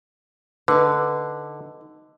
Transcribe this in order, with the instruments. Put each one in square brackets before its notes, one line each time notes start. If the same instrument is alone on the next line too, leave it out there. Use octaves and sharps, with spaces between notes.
[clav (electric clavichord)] D3 [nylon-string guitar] D#4 B4